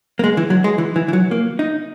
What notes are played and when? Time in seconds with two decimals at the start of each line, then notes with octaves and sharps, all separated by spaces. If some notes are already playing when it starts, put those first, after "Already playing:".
0.19 A#3
0.24 G#3
0.37 E3
0.50 F#3
0.64 G#3
0.78 E3
0.96 E3
1.08 E3
1.13 F#3
1.31 A#3
1.59 D#4